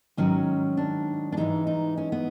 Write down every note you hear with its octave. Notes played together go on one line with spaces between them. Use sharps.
G#2 D#3 F#3 C#4
D4
D4
G#2 E3 G#3 D#4
D#4
C#4
B3